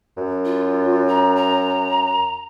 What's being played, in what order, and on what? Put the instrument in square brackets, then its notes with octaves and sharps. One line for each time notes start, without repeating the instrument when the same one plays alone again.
[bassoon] F#2
[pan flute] F4
A#5
A#5